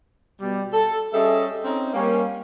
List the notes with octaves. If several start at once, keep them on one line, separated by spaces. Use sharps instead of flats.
B2 G3
A4
G3 C#4 G#4 A4 D#5 E5
C4 C#4 D#4
G3 A#3 C#4